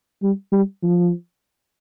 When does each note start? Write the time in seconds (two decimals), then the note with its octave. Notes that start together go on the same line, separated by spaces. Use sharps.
0.23 G3
0.52 G3
0.83 F3